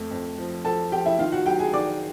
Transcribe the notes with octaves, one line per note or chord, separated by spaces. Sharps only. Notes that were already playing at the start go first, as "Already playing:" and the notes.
Already playing: F2 A3
F2
F3
F3 A4 A5
F3 G4 G5
E4 E5
D#3 F4 F5
F#4 F#5
F#3 G4 G5
G#4 G#5
D#3 D5 D6